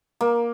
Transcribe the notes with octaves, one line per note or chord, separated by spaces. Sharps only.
A#3